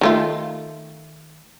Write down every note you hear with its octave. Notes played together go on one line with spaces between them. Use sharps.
D#3 A3 F4